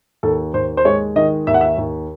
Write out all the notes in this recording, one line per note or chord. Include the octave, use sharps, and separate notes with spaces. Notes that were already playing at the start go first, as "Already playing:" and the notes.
D#2 A4
D#2 C5
C5
G#3 C#5
D#3 D#5
D#2 E5
F#5
E5
D#2